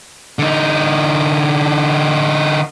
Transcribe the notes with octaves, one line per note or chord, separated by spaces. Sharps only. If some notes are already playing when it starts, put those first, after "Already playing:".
D3 D#4